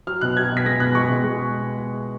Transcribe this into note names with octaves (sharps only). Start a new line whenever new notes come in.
F#3 F6
B2 F#6
F#3 G#6
B2
B6
G#3 A#6
B2 F#6
G#3 C#6
B2
G#3